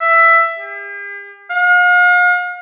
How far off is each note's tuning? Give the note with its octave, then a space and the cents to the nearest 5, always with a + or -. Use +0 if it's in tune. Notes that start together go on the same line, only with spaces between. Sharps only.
E5 +15
G4 +45
F5 +40